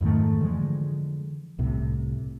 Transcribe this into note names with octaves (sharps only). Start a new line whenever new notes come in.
F2 G#2 D#3 A3
D3 E3 F3 G#3
C2 A2 C3